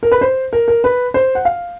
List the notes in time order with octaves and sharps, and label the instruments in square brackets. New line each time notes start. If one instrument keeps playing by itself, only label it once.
[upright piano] A#4
B4
C5
A#4
A#4
B4
C5
F#5
F5